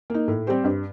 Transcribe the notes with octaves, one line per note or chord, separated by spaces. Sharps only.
A#3 D#4
A2
G3 C4 G4 C5
G2